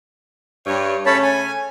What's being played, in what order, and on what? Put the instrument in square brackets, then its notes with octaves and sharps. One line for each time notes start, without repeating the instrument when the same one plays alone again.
[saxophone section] G2 C#5
[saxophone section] C#3 A3 C#4 [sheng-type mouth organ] C#5 A5 B5
[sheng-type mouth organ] G#5